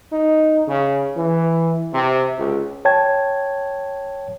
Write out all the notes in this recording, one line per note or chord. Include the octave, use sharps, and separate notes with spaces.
D#4
C#3
E3
C3
C#2
C#5 G5 A5 G#6